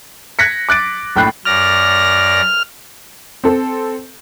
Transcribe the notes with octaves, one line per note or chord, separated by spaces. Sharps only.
F#6 G#6 A#6 B6 C#7
D6 F#6 A6 D7
A#1 A2 G5 B5 F#6 C7
F#2 D5 F6 A#6
C4 A4